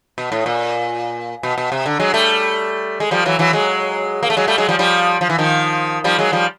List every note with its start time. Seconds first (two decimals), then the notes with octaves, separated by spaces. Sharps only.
0.18 B2
0.32 A2
0.46 A#2
1.43 B2
1.58 B2
1.72 C3
1.86 D3
2.00 F#3 G#3
2.14 G3 A3
3.00 G#3
3.11 F3 G3
3.25 E3 F#3
3.39 E3 F#3
3.53 F#3 G#3
4.23 A#3
4.30 A3
4.37 F#3 G#3
4.47 G3 A3
4.58 F#3 G#3
4.69 F3 G3
4.79 F3 G3
5.21 F3
5.29 E3
5.38 D#3 F3
6.04 F3 G3
6.19 F#3 G#3
6.32 F3 G3